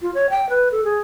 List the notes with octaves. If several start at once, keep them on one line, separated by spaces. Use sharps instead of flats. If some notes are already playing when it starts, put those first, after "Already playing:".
F4
C#5
G5
B4
A4
G#4